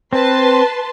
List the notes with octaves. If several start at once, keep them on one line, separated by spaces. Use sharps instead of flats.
C4 B4 A5 C6